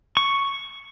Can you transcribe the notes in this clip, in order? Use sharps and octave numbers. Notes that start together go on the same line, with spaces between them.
C#6